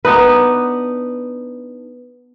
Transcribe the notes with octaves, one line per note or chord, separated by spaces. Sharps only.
B3 D4 D#4 B4